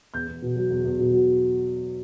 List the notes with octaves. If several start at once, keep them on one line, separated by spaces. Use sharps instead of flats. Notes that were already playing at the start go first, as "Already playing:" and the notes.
E2 G6
E2
B2
F#3
E2
E2
B2
F#3